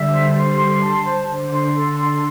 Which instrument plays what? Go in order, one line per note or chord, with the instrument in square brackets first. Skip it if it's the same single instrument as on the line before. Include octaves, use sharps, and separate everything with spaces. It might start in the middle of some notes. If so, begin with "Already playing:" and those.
Already playing: [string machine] D3 G3 [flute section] E5
[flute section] C5
[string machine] D3 [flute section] C5
[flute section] C6
A5
C5
[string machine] D3 [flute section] C5
[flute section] C6
A4
C6